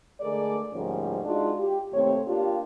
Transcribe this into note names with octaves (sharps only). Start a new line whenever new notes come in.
D3 G#3 A3 G#4 A#4 D5
D2 G#2 F3 G3 A#3 C#4
G#3 D4 D#4 F4 F#4
G4
D#2 C3 A3 C4 C#5
A#3 D4 F4 G4